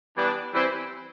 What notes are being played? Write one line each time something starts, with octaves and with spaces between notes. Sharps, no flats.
E3 G3 B3 D4
E3 G3 C4 E4